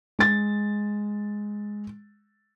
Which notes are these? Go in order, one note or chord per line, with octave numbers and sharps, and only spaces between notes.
G#3 A6